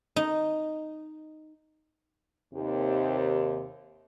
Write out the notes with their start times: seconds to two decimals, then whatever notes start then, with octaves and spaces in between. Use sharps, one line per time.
0.16 D#4
2.54 D#2 C3